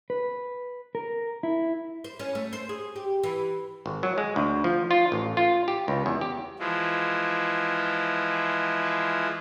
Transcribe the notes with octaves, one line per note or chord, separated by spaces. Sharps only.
B4
A#4
E4
C5
C#4
A3
C5
G#4
G4
E3
G#1
F#3
G#3
D2
F3
F4
A1
F4
G4
C#2
E2
G4
E3 F3 G#3